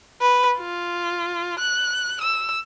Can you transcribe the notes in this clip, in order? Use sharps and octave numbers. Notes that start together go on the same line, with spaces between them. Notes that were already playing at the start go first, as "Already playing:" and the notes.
B4
F4
F#6
E6